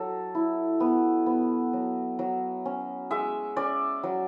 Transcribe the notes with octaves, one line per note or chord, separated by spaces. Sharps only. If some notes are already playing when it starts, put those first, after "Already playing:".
Already playing: F#3 A4
E4
B3
B3
F#3
F#3
C#4
G#3 E5
C#4 D5
F#3